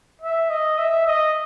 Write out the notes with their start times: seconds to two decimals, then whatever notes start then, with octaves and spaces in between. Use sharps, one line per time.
0.22 E5
0.50 D#5
0.78 E5
1.07 D#5